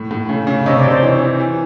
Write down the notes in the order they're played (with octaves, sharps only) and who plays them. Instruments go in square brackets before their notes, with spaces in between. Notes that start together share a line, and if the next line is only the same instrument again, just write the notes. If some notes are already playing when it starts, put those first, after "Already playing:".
Already playing: [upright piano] A2
A2
C#3
C#3
[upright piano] C3 [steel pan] C#5 D#5
[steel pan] C5 D5
[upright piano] C3
[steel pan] C5 D5
[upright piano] E3 [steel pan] C#5 D#5
[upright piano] E3
E3